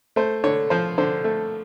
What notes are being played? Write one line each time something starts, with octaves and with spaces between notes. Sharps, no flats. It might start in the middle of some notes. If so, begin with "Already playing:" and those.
A3 C5
D3 C#5
F3 C5
D3 C5
A3